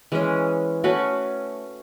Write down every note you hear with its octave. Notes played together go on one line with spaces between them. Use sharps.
E3 G#3 C#4
A3 C#4 F#4 B4